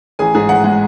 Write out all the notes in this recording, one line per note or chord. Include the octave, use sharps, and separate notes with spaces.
A1 G#4 G#5
G#2 G#4 G#5
A1 F#5
G#3 F#5